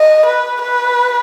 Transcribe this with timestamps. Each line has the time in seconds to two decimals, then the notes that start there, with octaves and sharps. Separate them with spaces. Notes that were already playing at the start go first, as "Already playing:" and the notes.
Already playing: D#5
0.26 B4
0.62 B4